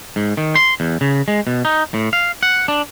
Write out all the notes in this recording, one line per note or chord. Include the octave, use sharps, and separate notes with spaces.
G#2
D#3
C6
E2
C#3
G#3
B2
D#4
A2
F5
F#5
D4